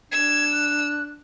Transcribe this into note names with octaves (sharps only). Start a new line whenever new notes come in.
D4 E6 G#6
F#6